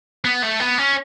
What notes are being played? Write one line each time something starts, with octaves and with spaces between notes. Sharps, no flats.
B3
A3
B3
C#4